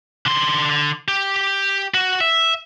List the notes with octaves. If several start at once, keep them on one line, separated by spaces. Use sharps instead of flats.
D3 C6
G4
F#4
E5